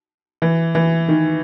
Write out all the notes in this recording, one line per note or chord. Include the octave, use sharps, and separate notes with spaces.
E3
E3
D#3